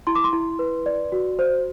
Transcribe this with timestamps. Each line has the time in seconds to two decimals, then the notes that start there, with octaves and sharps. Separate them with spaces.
0.07 E4 C6
0.15 D6
0.24 C6
0.33 E4
0.59 B4
0.86 D5
1.12 F#4
1.39 C5